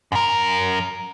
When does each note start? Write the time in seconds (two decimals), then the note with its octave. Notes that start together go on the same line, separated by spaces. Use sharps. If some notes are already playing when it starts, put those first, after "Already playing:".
0.12 F#2 A#4